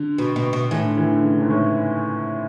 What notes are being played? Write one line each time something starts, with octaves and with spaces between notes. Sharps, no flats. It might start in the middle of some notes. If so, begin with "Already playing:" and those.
Already playing: D3
B2
B2
B2
A2 E3
D3
E3
D3
C#3
G#2
A2